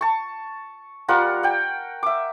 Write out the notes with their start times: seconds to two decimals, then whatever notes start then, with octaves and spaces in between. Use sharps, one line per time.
0.01 A5 C#6
1.08 G3 F4 A#4 F#5
1.43 F#5 G5
2.03 E5 D6